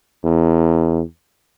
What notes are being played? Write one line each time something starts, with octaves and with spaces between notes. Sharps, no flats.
E2